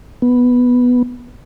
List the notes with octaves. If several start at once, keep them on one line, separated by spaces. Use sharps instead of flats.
B3